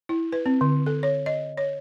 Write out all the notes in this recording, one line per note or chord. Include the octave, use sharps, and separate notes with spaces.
E4
B4
C4
D3
A4
C#5
D#5
C#5